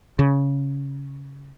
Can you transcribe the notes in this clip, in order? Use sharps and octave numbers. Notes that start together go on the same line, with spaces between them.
C#3